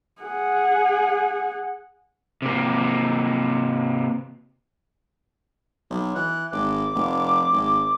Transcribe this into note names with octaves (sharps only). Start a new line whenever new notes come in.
G#4 F#5
C3 A#3
B1
E3 F#6
G#1 D6
F1
G#1